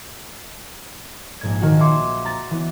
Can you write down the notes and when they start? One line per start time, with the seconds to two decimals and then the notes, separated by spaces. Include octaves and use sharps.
1.41 A#1 G#2 G#6
1.60 A#2 D#3 F#4 F#5
1.79 E5 F#5 C6 D6 G#6 C#7
2.25 A#5 A6
2.51 E3 B3